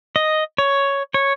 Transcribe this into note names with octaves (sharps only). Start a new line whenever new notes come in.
D#5
C#5
C#5